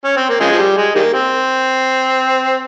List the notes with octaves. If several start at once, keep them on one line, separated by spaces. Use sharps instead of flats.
C#4
C4
A#3
C#3 F3 G#3
F3
G3
G#3
D#3 G3 A#3
C4